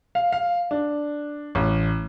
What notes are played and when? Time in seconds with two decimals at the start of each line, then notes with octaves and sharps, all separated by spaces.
0.15 F5
0.32 F5
0.71 D4
1.55 A1